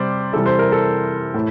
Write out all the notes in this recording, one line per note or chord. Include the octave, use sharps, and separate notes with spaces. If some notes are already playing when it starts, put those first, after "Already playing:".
Already playing: C3 G3 C5 D5
C3 E3 G3 A4
C5
A#4
A4
A2